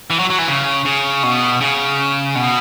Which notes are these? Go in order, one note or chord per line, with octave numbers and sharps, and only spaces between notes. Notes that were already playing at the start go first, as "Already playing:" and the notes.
E3
F#3
F#3
E3
C#3
C#3
B2
C#3
B2